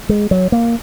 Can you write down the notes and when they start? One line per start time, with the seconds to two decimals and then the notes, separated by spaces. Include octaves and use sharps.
0.09 G#3
0.31 F#3
0.52 A#3